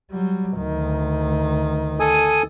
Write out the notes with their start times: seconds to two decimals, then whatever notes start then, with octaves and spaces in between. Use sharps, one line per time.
0.11 F#3 G3
0.58 D2 D#3
2.00 A4 G#5 D#6